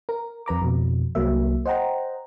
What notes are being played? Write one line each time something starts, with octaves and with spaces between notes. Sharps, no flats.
A#4
F2 B4 A#5 D6
F2 B2
C2 F#3 A#3 E5
C5 D#5 F#5 G5 A#5